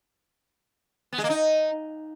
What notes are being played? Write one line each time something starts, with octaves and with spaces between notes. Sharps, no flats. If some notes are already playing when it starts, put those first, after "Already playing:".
B3
G#3
A#3
D#4